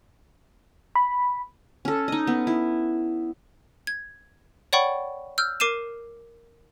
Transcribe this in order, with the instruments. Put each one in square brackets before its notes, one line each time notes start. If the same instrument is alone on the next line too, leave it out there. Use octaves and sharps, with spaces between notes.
[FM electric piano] B5
[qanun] C#4 A4
D#4 D#5
B3
E4
[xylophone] G#6
C#5 D5 F#5 G5 B5 C#6
E6 F6 G6
A#4 D6 C7 D#7 E7